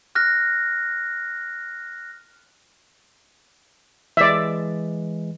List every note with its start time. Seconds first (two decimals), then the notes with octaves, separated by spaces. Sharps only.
0.15 F6 F#6 A#6
4.17 E3 G#3 D5 E5